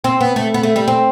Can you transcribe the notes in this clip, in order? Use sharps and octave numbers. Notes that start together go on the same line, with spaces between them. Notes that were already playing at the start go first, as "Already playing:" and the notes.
C4
B3
A3
B3
A3
G3
C4